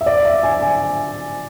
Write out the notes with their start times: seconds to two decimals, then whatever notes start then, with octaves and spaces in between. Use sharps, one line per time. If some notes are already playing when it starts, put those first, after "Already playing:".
0.01 E5
0.06 D5
0.25 E5
0.43 G#5
0.62 G#5